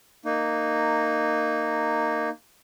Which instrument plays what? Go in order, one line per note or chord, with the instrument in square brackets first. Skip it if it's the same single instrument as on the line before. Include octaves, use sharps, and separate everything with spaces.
[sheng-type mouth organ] A#3 D#4